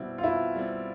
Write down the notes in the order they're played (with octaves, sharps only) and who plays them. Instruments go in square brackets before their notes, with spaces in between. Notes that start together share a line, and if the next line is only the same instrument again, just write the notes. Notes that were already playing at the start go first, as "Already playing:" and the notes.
Already playing: [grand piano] B2 G3 C4 [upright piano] E4
[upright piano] F4
[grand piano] B2 [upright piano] E4
[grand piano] G3 C4